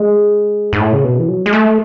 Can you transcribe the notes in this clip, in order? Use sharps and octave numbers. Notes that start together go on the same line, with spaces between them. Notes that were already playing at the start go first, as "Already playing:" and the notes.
Already playing: G#3
G#2
A2
C#3
B2
E3
F#3
G#3
A3